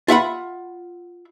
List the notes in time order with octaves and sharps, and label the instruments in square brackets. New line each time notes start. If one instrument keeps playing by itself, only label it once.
[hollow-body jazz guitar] F4 E5 F#5 B5